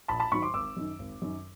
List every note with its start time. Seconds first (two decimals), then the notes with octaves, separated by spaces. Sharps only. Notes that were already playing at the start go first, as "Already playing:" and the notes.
0.08 A#1 A5 B5
0.20 A5 B5
0.32 G#2 D#3 F#3 B5 C#6
0.42 C6 D6
0.54 G#1 D6 E6
0.77 F#2 D#3
0.99 G#1
1.22 F#2 D#3